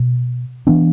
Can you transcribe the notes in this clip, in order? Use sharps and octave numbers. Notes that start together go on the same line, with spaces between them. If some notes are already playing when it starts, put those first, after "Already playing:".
Already playing: B2
E3 B3 D4